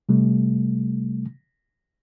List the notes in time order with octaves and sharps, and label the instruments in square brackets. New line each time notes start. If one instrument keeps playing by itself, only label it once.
[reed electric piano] C3 G3 A3